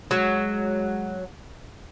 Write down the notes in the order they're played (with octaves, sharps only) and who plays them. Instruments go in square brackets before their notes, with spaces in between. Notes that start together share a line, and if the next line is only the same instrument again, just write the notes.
[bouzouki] F#3 [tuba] G#3